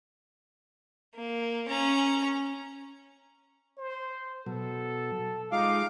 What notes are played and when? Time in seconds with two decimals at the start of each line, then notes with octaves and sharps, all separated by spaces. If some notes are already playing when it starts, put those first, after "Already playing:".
1.15 A#3
1.68 C#4 A#5
3.78 C5
4.46 B2 F#3 A4
5.52 G#3 D#4 F4 F5 D6